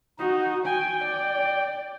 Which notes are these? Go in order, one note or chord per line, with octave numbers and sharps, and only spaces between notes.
D#4 F#4
G5 G#5
D5